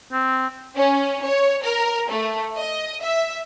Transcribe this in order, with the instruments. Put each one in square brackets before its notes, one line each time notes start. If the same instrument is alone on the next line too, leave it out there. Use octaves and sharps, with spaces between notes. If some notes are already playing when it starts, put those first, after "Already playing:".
[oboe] C4
[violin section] C#4
C#5
A#4
A3
D#5
E5